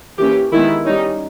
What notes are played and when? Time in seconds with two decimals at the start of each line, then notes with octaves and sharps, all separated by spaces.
0.18 E3 A#3 C#4 G4
0.52 D#3 G#3 B3 E4
0.86 G3 C#4 D#4